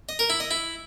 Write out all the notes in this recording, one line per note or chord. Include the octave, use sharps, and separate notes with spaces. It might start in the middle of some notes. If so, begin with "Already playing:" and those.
D#5
A#4
E4
D#5
E4